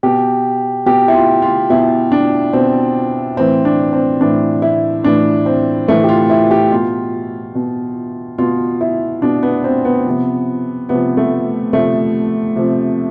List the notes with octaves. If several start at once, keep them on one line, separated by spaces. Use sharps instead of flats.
B2 G4
B2 G4
E4
F4
F4
B2 E4
D4
B2 C4
A2 E3 C4
D4
C4
A2 E3 D4
E4
A2 E3 D4
C4
A2 E3 A3
G4
F4
E4
G4
B2 F4
B2
B2 F4
E4
B2 D4
B3
C4
B3
C3 F3
C3 F3 B3
A3
C3 F3 A3
C3 F3